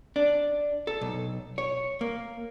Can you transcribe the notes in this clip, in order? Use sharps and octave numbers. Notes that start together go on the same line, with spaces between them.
D4
A4
B1
C#5
A#3